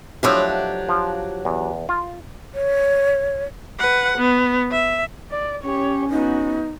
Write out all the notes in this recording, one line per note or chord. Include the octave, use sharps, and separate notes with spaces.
F3 F#3 A3 D4 E4 G4
F3
E2
F4
C#5
B4 F#5
B3
E5
D5
C#4 G4 C#5
B3 D#4 F#4